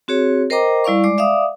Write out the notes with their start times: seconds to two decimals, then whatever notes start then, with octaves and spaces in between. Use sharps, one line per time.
0.08 C4 F#4 G#4 C#5
0.50 A#4 C5 D#5 G5 A#5 D6
0.84 G3 E4 D5 F5 C#6
1.04 G#3 D5 D6
1.18 D5 E5 F5 D6 D#6